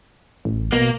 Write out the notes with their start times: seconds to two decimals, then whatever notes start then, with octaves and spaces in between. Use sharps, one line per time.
0.45 A1
0.72 B2 A#3